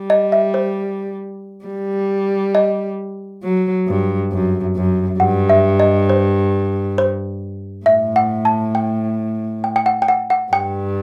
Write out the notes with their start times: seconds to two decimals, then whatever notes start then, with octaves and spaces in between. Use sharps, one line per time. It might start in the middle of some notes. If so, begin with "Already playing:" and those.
Already playing: G3
0.10 D#5
0.32 E5
0.54 C5
1.65 G3
2.55 D#5
3.43 F#3
3.87 G2
4.32 F#2
4.76 F#2
5.20 G2 F#5
5.49 E5
5.80 D#5
6.10 C5
6.98 C5
7.86 A2 E5
8.16 F#5
8.45 A5
8.75 G5
9.64 G5
9.76 G5
9.86 F#5
10.02 G5
10.08 F#5
10.30 F#5
10.53 G2 G5